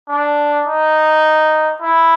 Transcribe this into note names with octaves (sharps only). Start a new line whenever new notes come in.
D4
D#4
E4